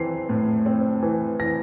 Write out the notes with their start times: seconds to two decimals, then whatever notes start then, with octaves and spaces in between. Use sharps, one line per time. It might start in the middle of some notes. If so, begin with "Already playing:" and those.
Already playing: E3 C4 C7
0.29 A2
0.66 C4
1.03 E3
1.40 E3 A#6